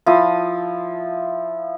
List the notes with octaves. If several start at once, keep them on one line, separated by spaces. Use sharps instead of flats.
F3 E4 D#6